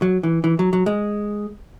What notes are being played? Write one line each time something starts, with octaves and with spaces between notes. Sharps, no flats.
F#3
E3
E3
F#3
F#3
G#3